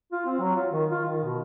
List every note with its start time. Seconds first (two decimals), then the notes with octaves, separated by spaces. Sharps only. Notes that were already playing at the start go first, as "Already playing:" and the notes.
0.12 F4
0.26 C4
0.39 F#3
0.55 F4
0.72 D#3
0.91 F4
1.05 D#3
1.24 B2